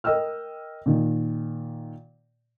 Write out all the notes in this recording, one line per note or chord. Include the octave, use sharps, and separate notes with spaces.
A#4 D#5 G5 E6 F6
A#2 D#3